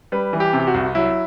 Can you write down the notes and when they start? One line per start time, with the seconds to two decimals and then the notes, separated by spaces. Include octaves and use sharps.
0.12 G3 B4
0.33 E3
0.40 G4
0.53 C3
0.60 G4
0.67 F#4
0.74 C2
0.95 F#3 E4